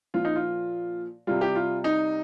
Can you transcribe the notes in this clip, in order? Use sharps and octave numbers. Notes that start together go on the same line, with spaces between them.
A#2 F3 F4
D#4
F4
C3 G3 F4
G4
F4
D#4